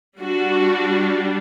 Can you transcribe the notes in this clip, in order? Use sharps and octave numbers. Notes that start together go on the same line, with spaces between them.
G3 D4 F#4